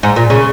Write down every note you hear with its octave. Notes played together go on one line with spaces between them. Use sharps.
G#2
A#2
C#3